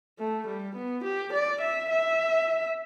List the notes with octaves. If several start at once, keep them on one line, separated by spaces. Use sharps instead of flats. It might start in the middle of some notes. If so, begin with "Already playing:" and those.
A3
G3
B3
G4
D5
E5
E5